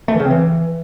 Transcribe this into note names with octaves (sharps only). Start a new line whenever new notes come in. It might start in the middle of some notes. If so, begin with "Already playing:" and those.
A3
E3
C#3
C4
E3